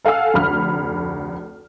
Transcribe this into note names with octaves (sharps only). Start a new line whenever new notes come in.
A4 F5 F#5 G#5 E6
F1 D2 B5 F6